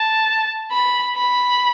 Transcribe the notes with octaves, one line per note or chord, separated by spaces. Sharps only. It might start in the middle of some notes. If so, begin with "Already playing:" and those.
Already playing: A5
B5
B5